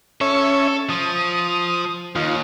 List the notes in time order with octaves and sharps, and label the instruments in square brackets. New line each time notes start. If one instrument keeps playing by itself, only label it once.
[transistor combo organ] C#4 C#5 E5 [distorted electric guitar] A4
[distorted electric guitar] F3 [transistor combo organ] D#6
[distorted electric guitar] D#2 [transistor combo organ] D#4 F4